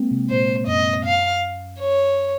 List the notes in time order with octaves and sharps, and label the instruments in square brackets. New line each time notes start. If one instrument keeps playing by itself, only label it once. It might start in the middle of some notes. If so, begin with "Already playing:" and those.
Already playing: [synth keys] G#3 A#3 C4
C3
[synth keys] A#2 [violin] C5
[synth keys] F#2 [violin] D#5
[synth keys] F#2 [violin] F5
[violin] C#5